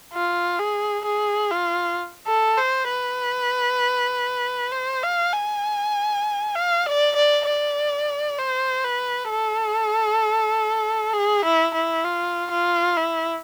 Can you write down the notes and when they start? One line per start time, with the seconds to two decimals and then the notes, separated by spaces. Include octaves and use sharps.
0.13 F4
0.59 G#4
1.05 G#4
1.51 F4
2.27 A4
2.58 C5
2.89 B4
4.72 C5
5.03 F5
5.33 G#5
6.55 F5
6.86 D5
7.16 D5
7.47 D5
8.38 C5
8.84 B4
9.30 A4
11.13 G#4
11.45 E4
11.74 E4
12.04 F4
12.51 F4
12.97 E4